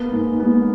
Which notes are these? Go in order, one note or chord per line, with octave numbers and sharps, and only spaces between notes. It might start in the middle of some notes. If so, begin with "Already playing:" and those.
Already playing: A#3 B3
G#2
B3